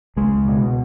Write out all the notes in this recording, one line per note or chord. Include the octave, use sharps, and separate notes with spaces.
C#2 G#3
B2